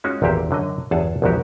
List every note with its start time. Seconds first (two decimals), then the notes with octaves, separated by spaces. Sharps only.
0.04 G#3 C#4 D#4 F4 F#4
0.22 G#1 E2 A#2 E4 G4 C5
0.51 F#2 D3 F#3 D#5
0.91 G1 E2 G#4 A4 F#5 A5
1.22 A#1 E2 G#2 B2 F#4 G4